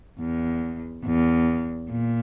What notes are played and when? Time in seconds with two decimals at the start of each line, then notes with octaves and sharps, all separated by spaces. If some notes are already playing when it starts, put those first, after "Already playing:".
0.19 E2
1.05 E2
1.90 A#2